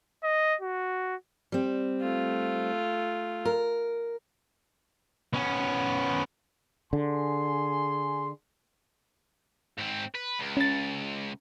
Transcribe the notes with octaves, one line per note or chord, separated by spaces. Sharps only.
D#5
F#4
G3 C4
A3 F4
A#4
B3 C#4
D3 G#4 G#5 C6
G#2 C4
B4
C#2
C#4 A6